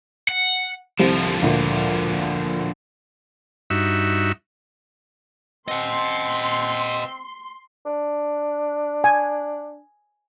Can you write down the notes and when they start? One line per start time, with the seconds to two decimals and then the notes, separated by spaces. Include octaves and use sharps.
0.29 F#5
0.99 C2 D3 F3 G4 C5
1.42 D2 A#2
3.70 G2 D#4 F#4 E5 E6
5.68 C4 D#5 F#5 C6
7.86 D4
9.04 G#5